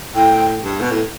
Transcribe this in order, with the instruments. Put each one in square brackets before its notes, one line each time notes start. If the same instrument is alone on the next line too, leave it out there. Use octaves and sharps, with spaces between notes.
[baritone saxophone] A2 [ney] G5
[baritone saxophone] G2
B2
A2